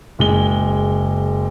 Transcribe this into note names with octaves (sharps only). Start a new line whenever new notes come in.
F#1 G#3 G7